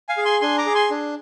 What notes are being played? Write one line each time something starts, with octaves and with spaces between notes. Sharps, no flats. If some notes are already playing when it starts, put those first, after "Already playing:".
F5 G#5
G#4
G#5 C6
D4 G#5 C6
A#5 D6
G#4
G#5 C6
D4